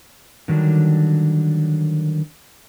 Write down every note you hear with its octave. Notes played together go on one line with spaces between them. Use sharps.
D3 D#3 F#3 G3 D4